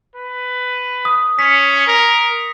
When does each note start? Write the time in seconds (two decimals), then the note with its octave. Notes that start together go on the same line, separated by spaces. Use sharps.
0.15 B4
1.05 D#6
1.39 C#4 B6 C#7
1.87 A#4